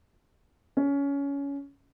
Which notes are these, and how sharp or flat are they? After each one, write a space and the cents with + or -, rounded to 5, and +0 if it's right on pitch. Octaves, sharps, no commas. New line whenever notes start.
C#4 +20